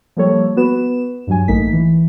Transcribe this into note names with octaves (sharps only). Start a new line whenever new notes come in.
F3 G3 A#3 A4 C#5
B3 F#4 B4 E7
G2 F#3 G#5
A1 A3 A#3 D#4 B6
E3